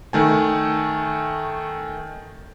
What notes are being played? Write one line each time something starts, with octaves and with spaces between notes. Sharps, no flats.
D#3 A3 G#5